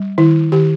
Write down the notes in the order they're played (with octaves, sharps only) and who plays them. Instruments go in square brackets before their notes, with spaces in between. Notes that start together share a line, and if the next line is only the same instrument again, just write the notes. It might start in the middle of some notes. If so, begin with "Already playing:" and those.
Already playing: [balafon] G3
D#3 E4
D#3 G4